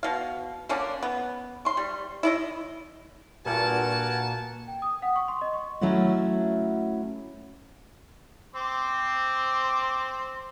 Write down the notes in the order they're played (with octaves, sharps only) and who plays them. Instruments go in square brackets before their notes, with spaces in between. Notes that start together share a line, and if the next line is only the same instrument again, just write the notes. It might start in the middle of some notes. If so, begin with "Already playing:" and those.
[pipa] B2 F5
D3 A#3 C#4 D4
B3
C6 C#6
G3
E4 D5 D#5
[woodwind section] G2 [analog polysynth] A#2 F#4 [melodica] A#4 F#5 G#5 [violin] A5
[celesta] G5
D#6
F#5
C#6
C6
D#5
C#6
[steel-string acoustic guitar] F#3 A3 C#4 E4 F#4
[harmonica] C4 C6 D6